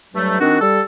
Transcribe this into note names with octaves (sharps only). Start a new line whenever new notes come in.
G2 F#3 G3 A3
D#3 C4 D4 F#4
G3 A4